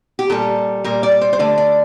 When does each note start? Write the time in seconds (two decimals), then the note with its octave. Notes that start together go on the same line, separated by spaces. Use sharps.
0.19 G4
0.30 A#2 G3 A4
0.84 A#2 G3 A#4
1.03 D5
1.21 C5
1.33 C5
1.39 D3 A3 D5
1.58 D5